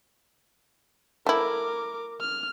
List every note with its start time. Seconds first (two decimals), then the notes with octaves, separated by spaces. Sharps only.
1.27 A3 E4 A#4 D6
2.20 F6